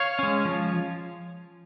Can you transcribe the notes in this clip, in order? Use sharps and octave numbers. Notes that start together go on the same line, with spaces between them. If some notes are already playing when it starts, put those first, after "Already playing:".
Already playing: C#5 F5
G#3 C#4
F3